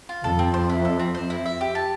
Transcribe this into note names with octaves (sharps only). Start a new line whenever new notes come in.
F4
F2 A4
C4
C5
E4
A4
C4
C5
E4
E5
G4
A5